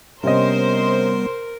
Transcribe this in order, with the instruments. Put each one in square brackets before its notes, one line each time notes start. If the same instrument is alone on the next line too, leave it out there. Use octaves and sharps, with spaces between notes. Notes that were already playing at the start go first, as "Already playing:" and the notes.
[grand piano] C3 C#4 D#5 [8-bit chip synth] G3 B3 [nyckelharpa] A#4 [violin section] C5